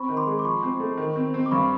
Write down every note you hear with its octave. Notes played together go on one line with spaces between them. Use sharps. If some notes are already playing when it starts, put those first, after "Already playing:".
Already playing: C4 B5 C#6
D#3
C6 D6
G#3
D6
F3 B5 C#6
C4
A3
D#3
C4
C4
D6
G2 B5 C#6